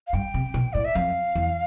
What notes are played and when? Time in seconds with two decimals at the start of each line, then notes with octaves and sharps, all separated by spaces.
0.07 F5
0.13 G2 G5
0.34 C3
0.54 B2
0.73 A2 D5
0.84 E5
0.95 F2 F5
1.35 E2